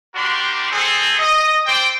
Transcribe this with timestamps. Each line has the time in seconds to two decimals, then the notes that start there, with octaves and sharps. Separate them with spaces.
0.15 G3 D4 F#4 G4 A#4 C6
0.72 C4 G#4 A4
1.19 D#5
1.66 C4 C5 D5 G5